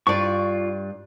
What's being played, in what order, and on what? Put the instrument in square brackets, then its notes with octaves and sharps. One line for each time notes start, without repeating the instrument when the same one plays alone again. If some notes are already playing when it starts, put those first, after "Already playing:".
[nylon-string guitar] G2 D5 [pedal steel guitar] F4 C#6